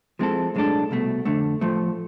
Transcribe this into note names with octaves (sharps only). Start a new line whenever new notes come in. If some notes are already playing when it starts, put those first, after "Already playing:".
F3 G#3 C4 E4 A4
B1 A2 G#3 D4 A4
C2 B2 A3
F2 D3 A3
A2 F3 A3